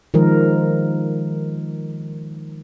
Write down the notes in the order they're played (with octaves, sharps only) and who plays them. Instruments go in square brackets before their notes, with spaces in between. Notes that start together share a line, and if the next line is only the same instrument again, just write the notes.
[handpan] D#3 F3 G#3 A#4